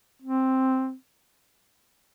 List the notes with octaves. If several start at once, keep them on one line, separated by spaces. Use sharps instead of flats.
C4